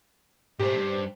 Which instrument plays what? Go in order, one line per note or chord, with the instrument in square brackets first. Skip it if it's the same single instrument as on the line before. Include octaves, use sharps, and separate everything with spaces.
[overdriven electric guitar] G#2 A3 [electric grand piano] G4 C5
[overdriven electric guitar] G2